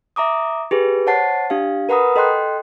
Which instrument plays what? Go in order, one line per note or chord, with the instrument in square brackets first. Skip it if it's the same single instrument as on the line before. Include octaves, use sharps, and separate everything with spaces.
[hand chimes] E5 A#5 D6 D#6
G4 G#4 B4
C5 C#5 F#5 A5 A6 C7
D4 G4 F5
A#4 B4 F#5 A#5 B5 D#6
A4 D#5 G5 C6 F#6